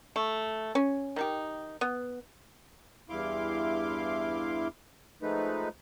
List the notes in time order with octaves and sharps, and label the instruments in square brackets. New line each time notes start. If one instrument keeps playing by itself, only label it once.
[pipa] A3
C#4
D#3 D#4 G4
B3
[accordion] E2 G2 E4 F5 C6 D6
F3 G#3 A3 D#4 B4